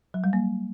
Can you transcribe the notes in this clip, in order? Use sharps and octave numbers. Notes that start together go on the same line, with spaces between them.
F#3
G3
A#3